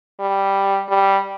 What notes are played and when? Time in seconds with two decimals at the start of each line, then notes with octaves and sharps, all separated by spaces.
0.20 G3
0.89 G3